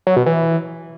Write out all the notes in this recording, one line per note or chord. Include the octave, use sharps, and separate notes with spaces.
F#3
B2
E3